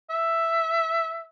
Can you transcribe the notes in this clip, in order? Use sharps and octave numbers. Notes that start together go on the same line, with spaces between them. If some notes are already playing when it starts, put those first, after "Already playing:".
E5